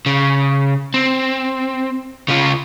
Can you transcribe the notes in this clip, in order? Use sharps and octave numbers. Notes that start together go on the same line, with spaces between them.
C#3
C4
C#3 F4